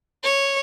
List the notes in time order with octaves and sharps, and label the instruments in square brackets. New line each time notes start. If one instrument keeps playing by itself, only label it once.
[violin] C#5